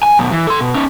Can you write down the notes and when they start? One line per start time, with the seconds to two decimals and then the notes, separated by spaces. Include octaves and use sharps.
0.03 G#5
0.19 F#2 B2
0.31 E3
0.47 A4 C6
0.61 B2
0.74 C#4 D#4